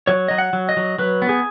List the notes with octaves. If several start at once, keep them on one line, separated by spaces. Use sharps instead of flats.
F#3 C#5
F#3 D#5
F#5
F#3
D#5
F#3
F#3 B4
B3
G#4